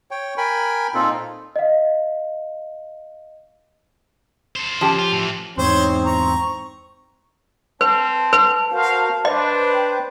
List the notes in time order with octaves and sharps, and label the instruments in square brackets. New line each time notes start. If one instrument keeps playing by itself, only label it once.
[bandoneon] C#5 G5
A#4 G5 G#5 B5
A#2 C4 D#4 F4 A4
[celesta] D#5 F5
[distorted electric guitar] A4 C5
[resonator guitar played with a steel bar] F3 C#4 G4
[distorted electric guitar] F4
A2 E3
[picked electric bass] E2 G#2 [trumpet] C4 [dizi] D#4 [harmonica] C5 C#5
[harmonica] A#5 [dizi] C#6
[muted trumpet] C4 [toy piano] B4 [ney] A5
[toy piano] B4
[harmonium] F#4 A#4 C5 [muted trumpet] F5
[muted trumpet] D4 [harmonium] B4 C5 [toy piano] D#5
[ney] G5